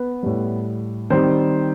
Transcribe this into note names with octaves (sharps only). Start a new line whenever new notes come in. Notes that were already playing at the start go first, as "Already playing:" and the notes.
Already playing: B3 B4
A2 G3
D#3 G3 C4 C5